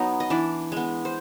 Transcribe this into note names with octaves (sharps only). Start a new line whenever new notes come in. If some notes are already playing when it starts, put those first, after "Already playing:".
Already playing: F#3 B3 D#4
D#5
E3 D4 D5
G#3 B3
C5